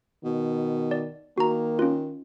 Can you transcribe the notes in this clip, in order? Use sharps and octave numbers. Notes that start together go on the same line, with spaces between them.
B2 D#3
D5
D#3 A#3 F#4 A#5
C#4 F4